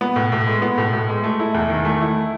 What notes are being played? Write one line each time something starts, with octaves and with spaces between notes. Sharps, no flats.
B3
A2
A2
G#3
B3
A2
A2
G#3
A3
E4
E2
D#3
A3
E4